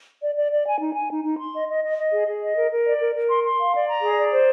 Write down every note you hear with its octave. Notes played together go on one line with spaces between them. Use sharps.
D5
D5
D5
G#5
D#4
G#5
D#4
D#4
C6
D#5
D#5
D#5
D#5
G#4
G#4
D#5
A#4
A#4
D5
A#4
A#4
C6
C6
F5
D5
A#5
G#4
D5
C5